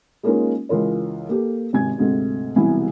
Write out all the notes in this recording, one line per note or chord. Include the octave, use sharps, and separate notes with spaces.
G#3 A#3 C#4 D#4 F4 A#4
C#2 E3 F4 A#4 C#5
A#3 G4 A4
G#1 C3 G#5 G#6
D2 G#2 C3 A3 C4
E1 C2 C3 E3 E4 G#5